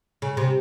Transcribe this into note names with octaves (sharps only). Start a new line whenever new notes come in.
C#3
C3